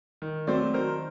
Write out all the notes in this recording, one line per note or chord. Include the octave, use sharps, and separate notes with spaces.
D#3
F#3 A3 C4 C5 D5
D#3 A#4 C5